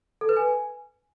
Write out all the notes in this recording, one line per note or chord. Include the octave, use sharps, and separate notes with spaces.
A4
B4
G#5